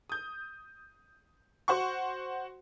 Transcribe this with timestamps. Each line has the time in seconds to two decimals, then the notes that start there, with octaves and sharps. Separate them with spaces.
0.10 D#6 G6
1.68 F#4 C5 F#5 C6 C#6